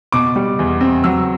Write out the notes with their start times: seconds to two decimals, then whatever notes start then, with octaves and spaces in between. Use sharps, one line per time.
0.12 B2 D6
0.36 G3
0.59 E2
0.81 C4
1.04 F#3 E6